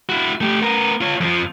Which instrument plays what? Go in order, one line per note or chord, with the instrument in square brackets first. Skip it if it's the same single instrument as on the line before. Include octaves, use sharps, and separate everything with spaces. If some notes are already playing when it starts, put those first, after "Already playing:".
[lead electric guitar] E4 F#4
A3 G4
B3 A#4
F4 C#5
F2 F3